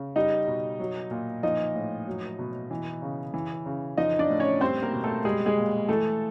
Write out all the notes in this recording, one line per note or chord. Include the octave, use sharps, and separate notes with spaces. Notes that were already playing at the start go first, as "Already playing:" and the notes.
Already playing: C#3
G3 D#4 D#5
B2
F#3
A#2
F3 D#4 D#5
A2
F#3
B2
E3
C#3
E3
C#3
F3 D#4 D#5
D4 D5
A2
C#4 C#5
G3 C4 C5
A#3 A#4
B2
A3 A4
G3 G#3 G#4
G#3 G#4
A#2
E3 A3 A4